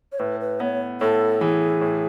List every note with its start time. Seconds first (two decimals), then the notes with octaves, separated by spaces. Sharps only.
0.12 C#5
0.19 A2 B4
0.40 B4
0.60 B3 C#5
1.01 A2 A4
1.41 E3 G#4
1.81 A2